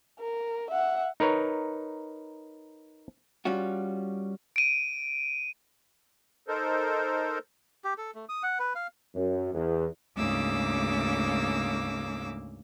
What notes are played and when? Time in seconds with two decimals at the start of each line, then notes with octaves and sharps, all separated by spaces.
0.19 A#4
0.70 E5 F#5
1.20 D#4 A#4 B4 C#5
3.45 G3 C#4 F4 F#4
4.56 D7 D#7
6.48 D#4 A4 A#4 C5
7.84 G4
7.98 A4
8.15 A3
8.29 D#6
8.43 F#5
8.59 B4
8.75 F5
9.15 F#2
9.54 E2
10.15 D2 G#2 C#3 A#3 D6 E6